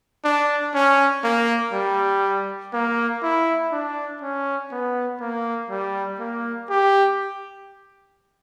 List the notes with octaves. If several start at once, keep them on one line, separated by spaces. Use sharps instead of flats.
D4
C#4
A#3
G3
A#3
E4
D4
C#4
B3
A#3
G3
A#3
G4